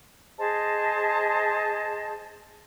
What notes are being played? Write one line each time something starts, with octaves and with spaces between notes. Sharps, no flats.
G#4 C5 D#5 A5